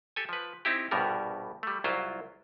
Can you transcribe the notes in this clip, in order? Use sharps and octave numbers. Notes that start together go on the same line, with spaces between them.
G4 A4 G#5
F3 B4
C4 D#4 E4 G4
A#1 G2 B2 G3 B3 A#4
G3 A3
C2 F#3 E4 F4 C5